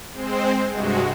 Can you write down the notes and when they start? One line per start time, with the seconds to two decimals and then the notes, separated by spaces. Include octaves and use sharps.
0.12 G#3 C4 C5
0.70 G2 C3 G#3 F#4